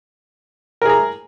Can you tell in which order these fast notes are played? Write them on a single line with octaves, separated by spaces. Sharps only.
A#4 G#4 A#5